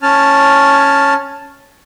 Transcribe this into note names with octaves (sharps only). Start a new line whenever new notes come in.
C#4 A5 F6